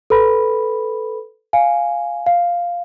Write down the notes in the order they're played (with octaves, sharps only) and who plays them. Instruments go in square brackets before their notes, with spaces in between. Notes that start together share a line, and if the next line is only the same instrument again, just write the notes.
[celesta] A4 B4 B5
F5 G#5
F5